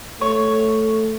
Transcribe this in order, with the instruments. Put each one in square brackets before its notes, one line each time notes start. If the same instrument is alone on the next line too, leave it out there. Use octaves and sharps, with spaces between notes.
[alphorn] A3 [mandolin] C#5